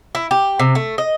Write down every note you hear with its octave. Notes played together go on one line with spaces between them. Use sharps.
E4
G4
C3
A3
D#5